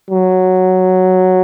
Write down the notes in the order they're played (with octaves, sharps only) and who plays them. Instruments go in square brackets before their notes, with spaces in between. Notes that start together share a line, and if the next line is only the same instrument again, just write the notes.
[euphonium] F#3